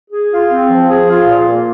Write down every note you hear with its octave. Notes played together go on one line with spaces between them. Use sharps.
G#4
F4
C4
F3
G#4
F4
A#2
A#3